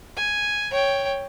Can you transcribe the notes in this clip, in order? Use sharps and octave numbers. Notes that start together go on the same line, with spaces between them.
G#5
C#5 G5